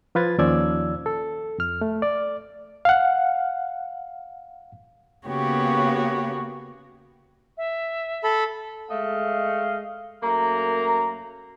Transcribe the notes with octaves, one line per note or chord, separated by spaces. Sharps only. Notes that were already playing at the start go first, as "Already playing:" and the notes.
F3 F4 B4 G#6 A6
D#2 F3 C#4 D5 E6 G#6
A4
F2 F6
A3
D5
F5 F#5
C#3 A#3 B3 F#4 G4 C#5
E5
A4 B5
G#3 A3 D#5 F5
F#2 A3 A#3 A#5